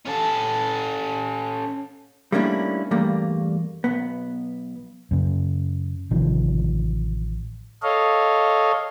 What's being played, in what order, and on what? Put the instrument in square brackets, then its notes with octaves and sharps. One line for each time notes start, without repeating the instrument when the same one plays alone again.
[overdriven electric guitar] C#4 A4
[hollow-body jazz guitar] G3 A3 A#3 C#4 D4 E4
E2 G2 G3 A3 A#3
B1 B3
[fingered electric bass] F#2 C#3
A1 C3 D#3 F3
[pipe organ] A4 C#5 D#5 F5